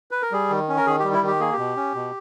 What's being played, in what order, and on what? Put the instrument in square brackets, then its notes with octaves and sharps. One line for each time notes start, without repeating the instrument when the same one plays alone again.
[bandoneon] B4
A#4
G3 G#4
D#3
C#4
A#4
D#3 G#4
G3 G4
E4
D#3 G4
A#3 G#4
G4
B2
C#4
B2